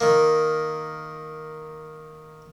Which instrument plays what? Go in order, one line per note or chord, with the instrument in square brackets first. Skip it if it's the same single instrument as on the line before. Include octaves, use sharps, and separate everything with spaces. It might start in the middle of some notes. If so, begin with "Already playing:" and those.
[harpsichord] D#3 A#3